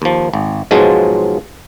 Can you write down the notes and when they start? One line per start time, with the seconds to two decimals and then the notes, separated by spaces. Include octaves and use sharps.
0.02 D#2 F3
0.34 G#1
0.71 G#2 B2 F3 F#3 G#3 F4